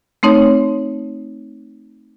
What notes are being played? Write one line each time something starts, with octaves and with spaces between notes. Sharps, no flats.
A3 C4 D#4 C#5